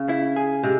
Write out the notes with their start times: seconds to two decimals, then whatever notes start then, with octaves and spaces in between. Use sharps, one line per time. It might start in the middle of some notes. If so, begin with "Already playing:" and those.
Already playing: C#3
0.09 E4
0.36 G#4
0.63 C3 G#3